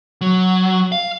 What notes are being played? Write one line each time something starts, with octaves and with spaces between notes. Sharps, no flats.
F#3
F5